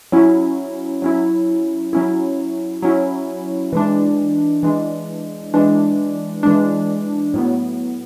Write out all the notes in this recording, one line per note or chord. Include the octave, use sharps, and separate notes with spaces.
F#3 C#4 E4
F#3 C#4 E4
F#3 C#4 E4
F#3 C#4 E4
E3 G#3 D4
E3 G#3 D4
E3 G#3 D4
E3 G#3 D4
A2 F#3 B3